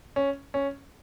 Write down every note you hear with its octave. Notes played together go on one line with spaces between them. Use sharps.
C#4
C#4